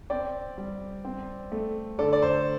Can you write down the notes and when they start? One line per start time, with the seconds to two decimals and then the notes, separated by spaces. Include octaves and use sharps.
0.10 C4 D5 G5
0.58 G3
1.05 C4
1.52 A3
1.99 D3 A4 D5
2.13 D5
2.22 C5